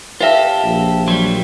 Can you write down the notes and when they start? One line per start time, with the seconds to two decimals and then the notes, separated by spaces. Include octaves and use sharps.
0.21 F4 G4 A4 B4 E5 F5
0.64 A#1
1.08 F#3 G3 C6